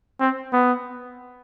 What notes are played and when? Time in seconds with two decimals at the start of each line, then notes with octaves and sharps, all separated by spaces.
0.20 C4
0.53 B3